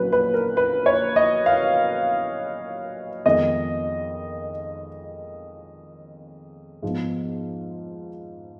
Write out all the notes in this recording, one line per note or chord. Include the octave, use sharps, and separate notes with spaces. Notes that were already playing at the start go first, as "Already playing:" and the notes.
Already playing: A#1 A#2 F#3 C#4 B4
B4
A#4
B4
C#5
D#5
F5
F2 D#3 G#3 B3 D#5
G#2 F3 B3